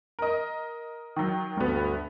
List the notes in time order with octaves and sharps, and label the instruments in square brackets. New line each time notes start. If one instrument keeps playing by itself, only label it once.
[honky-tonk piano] A#4 D#5
D#3 F#3
[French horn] D2 [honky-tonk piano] G2 B3